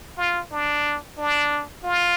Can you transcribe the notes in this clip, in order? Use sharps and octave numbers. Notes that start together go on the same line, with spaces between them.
F4
D4
D4
F4